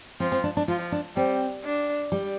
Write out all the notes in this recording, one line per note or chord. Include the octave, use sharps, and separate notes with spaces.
F3 C4
C4
D4
D4
F3 F4
D4
G3 C4
D4
G3